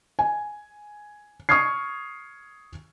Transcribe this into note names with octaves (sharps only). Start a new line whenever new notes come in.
G#5
C#6 D#6 F6 G#6 C7